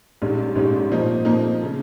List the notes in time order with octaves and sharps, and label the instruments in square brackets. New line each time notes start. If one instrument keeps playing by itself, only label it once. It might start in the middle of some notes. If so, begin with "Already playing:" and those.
[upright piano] A#1 G#2 G3 C#4
A#1 G#2 G3 C#4
A#2 F3 A#3 D#4
A#2 F3 A#3 D#4
C#3